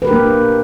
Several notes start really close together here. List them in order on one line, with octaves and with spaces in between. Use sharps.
B4 A#4 G4 D4 A#3